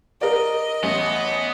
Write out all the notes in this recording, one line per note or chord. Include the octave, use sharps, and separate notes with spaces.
A#4 D5 D#5
A1 B3